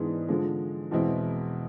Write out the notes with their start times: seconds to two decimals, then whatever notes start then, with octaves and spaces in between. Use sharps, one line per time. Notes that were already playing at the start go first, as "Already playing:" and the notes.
Already playing: G#2 E3 B3 D4 G#4
0.28 D3 F3 G#3
0.91 E2 B2 G#3 C4 E4